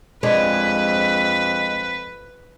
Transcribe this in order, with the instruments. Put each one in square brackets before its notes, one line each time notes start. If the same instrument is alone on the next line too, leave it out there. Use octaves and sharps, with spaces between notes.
[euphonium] F2 [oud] G#3 D4 [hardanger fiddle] B4